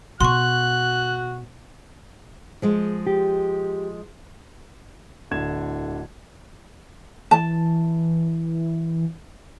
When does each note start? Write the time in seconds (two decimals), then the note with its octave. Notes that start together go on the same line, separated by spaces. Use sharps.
0.21 B2 F#4 C6 C#6 F#6
2.62 F3 G#3
3.07 G4
5.31 D1 D3 E4 G#6 E7
7.31 E3 A5